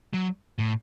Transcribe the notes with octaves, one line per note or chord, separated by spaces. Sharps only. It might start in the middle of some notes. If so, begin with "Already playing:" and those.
F#3
A2